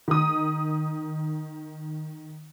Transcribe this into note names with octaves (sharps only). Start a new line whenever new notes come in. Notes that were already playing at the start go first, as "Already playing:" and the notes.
D#3 D#6